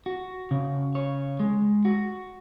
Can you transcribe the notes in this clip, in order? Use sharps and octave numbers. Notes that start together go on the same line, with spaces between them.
F#4
C#3
C#5
G#3
F#4